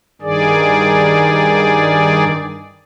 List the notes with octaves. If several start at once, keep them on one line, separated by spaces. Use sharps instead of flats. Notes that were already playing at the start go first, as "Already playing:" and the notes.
G2 D#3 G#4 D5